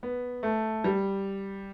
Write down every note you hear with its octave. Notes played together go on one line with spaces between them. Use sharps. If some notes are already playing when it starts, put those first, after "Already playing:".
B3
A3
G3